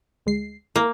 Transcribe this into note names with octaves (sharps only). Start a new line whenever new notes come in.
D2 G#3 C7
A#3 E4 A#4